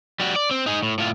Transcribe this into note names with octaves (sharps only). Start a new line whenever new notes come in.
G3 F#4
D5
C4
D#4 G#4
A2
A2 F4